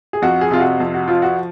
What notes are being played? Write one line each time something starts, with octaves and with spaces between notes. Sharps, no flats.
G#4
F2 F#4
G#4
C3 F4
F#4
F2
F#4
F3 F4
F#4